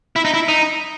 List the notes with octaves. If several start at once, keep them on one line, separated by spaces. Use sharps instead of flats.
E4
D#4
E4
D#4